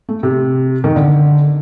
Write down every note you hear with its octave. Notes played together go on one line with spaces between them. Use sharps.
A3
C3
D#3
D3